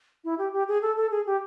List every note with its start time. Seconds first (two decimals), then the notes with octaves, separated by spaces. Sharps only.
0.25 E4
0.38 G4
0.53 G4
0.68 G#4
0.82 A4
0.97 A4
1.11 G#4
1.26 G4